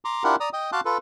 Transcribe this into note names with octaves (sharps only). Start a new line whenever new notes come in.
A#5 C6 D6
D4 E4 F4 G4 A#4 F#5
D5 A#5 D#6
D#5 G5 D#6
F#4 F5 A5 C6 D6 F#6
F4 A4 B4